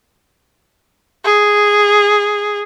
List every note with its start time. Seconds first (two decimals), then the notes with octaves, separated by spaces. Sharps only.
1.24 G#4